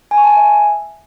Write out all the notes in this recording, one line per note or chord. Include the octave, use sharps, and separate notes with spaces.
G#5
C#6
A5
G#5
E5